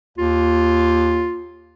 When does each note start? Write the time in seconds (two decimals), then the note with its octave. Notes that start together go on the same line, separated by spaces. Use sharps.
0.18 D#2 F4